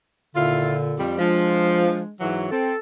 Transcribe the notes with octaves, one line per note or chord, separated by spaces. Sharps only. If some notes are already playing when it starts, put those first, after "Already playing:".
D#2 A#2 D3 E4 F4
F2 G3
F3 G#3 D4
G#2 E3 F#3
C4 A4